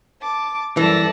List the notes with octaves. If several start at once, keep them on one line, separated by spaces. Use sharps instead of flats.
A5 D6
F#2 E3 G3 A4 D5 E5 A5 A#6